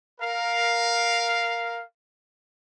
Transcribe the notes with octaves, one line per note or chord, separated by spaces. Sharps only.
A#4 F5